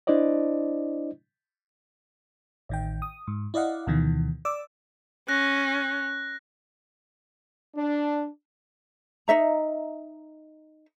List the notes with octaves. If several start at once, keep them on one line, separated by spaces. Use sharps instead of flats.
D4 E4 C5 D5 D#5
A1 D#3 G5
D#6
G#2
E4 D5 D#5 F5 F#5
D2 B2 D#3 E3
D5 D6 E6
C#4 F#6 A#6
D4
D#4 D#5 E5 A#5